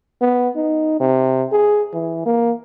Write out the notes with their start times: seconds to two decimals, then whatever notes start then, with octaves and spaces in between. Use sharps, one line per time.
0.21 B3
0.56 D#4
1.00 C3
1.52 G#4
1.94 E3
2.26 A#3